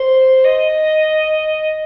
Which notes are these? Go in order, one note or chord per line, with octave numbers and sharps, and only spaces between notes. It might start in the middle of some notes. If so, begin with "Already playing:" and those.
Already playing: C5
D#5